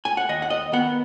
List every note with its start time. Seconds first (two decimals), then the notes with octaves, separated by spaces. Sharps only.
0.05 G#5
0.17 F#5
0.29 D#2 D#5
0.42 F#5
0.50 D#5
0.72 D#3 B3 F#5